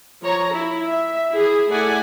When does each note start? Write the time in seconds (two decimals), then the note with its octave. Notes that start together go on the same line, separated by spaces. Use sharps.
0.23 F3 C#5 A#5
0.52 E4
0.88 E5
1.33 E4 G#4
1.70 A3 E4 A4 D5 F#5 G#5